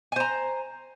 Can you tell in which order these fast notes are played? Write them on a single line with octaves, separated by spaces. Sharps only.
G#5 C5 A#5